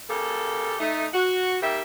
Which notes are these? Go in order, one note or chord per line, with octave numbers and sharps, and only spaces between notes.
C#3 A#3 G4 A4
A3 D#4
F#4
G3 A#3 D#4 G4 E5